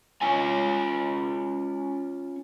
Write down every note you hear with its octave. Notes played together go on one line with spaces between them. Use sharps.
C#4 F4 G#5